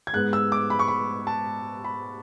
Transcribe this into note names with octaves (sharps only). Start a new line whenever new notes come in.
G#6
G#2 G#3 B3 F#6
E6
D6
B5
C#6
B5
A5
B5